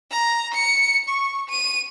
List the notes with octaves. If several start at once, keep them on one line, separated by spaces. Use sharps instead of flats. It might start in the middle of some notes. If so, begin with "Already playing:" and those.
A#5
C#7
C#6
D#7